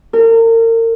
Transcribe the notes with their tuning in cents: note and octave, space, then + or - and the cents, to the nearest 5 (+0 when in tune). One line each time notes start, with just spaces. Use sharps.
A#4 -35